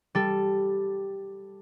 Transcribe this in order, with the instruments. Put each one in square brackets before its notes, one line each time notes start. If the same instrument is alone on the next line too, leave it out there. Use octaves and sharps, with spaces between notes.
[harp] G3 A4